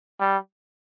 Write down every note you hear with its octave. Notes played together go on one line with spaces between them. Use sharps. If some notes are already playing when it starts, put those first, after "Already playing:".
G3